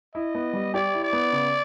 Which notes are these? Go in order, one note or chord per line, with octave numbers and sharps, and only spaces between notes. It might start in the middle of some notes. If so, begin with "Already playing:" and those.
E4 D#5
B3
G3
G4 D5
E4
D5
B3
C#3